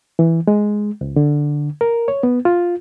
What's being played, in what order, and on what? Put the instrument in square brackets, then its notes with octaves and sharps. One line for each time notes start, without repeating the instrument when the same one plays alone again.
[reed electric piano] E3
G#3
C#2
D3
A#4
C#5
B3
F4